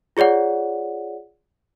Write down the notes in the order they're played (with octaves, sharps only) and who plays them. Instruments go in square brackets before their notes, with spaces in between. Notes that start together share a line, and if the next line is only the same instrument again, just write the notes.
[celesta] F4 G#4 C#5 D5 F#5